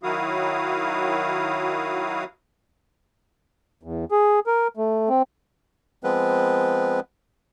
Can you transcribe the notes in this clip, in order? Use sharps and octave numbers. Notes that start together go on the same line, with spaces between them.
D#3 F#3 E4 F#4 F5 D#6
E2
G#4
A#4
A3
C4
F3 G#3 B3 C4 B4